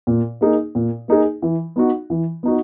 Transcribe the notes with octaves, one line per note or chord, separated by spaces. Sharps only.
A#2
A#3 D#4 G#4
A#2
A#3 D#4 G#4
E3
B3 D#4 F#4
E3
B3 D#4 F#4